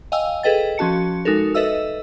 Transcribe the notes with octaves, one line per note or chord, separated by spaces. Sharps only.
D#5 F5 G5 G#5 E6
G#4 A4 B4 D#5 G5 A6
F3 C#4 F#4 A5 C#7
G#3 D#4 F#4 A4 A#4
A4 B4 D#5 E5 E6